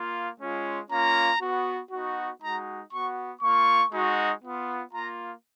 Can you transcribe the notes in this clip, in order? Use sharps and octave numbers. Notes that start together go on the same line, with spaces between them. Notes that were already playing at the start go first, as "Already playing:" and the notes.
Already playing: A#3 F4
G#3 C#4 F4
A#3 C#4 F4 A#5
B3 F#4
B3 D#4 F#4
G#3 D#4 F#4 A#5
B3 F#4 C#6
A#3 F4 C#6
G#3 D#4 F#4
B3 F4
A#3 F4 A#5